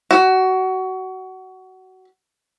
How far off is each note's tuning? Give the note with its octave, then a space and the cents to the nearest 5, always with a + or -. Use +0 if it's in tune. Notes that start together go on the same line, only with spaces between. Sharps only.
F#4 +20